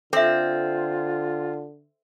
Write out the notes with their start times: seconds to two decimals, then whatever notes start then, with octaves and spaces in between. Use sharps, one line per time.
0.13 D3 C4 F4 A4 E5